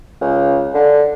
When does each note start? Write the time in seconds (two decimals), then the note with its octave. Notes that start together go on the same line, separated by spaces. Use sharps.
0.21 C#2
0.74 D3